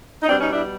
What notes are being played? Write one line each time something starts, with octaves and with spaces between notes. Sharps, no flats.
D#4
B2 G3 C4 D4
C#4 D#4
D4 E4